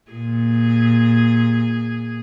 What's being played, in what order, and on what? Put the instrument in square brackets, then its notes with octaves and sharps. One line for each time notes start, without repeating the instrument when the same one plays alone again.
[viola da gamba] A#2 G#4